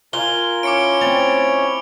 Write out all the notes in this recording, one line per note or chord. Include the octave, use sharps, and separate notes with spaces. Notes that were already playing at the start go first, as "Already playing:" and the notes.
F4 A#4 G#5 G7
C#4 E4 C#5 D6 C#7 D7
C4 D5 F7